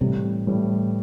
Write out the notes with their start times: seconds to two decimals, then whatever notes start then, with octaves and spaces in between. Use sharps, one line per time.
0.01 A2 C3 E3 G3
0.47 A2 E3 G3